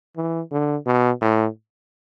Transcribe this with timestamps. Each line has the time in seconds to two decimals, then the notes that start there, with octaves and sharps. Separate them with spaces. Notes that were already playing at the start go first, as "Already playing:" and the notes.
0.16 E3
0.52 D3
0.86 B2
1.22 A2